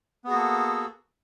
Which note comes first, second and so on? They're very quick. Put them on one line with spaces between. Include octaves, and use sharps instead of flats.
B3 G#4 F#4 A#3 A4